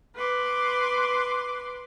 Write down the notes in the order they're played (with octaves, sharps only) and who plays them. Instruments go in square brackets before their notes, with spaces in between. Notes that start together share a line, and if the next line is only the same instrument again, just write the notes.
[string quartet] B4 C6 D6